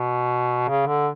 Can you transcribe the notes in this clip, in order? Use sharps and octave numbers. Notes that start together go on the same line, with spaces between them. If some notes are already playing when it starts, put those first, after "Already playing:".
Already playing: B2
C#3
D3